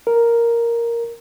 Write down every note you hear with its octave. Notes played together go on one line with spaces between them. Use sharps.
A#4